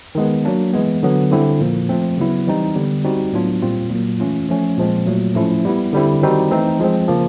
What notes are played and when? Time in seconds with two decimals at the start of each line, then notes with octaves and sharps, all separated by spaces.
0.15 D#3 G#3 B3
0.45 F#3 A#3 D4
0.73 E3 G#3 B3
1.03 D3 F#3 B3
1.32 D3 G3 C4 E4
1.61 A#2 F3 A#3
1.89 F3 A3 C4
2.17 C#3 F#3 B3 E4
2.47 E3 G3 C4 D#4
2.75 D3 G3 B3
3.04 G3 C4 D#4 F#4
3.33 A2 F#3 B3 D4 F4
3.62 A#2 G3 C4 F4
3.90 A#2 F#3 A#3
4.20 E3 A3 C#4 F4
4.49 F3 A3 C#4
4.77 A#2 F3 G#3 C4
5.06 A#2 F#3 A3
5.35 A2 F3 A3 C#4 E4
5.65 G3 B3 E4
5.93 D3 G3 C4 E4
6.22 D#3 G3 C4 D#4 F#4
6.51 E3 A3 C4 D#4
6.79 F3 G#3 C4
7.08 C#3 F3 A#3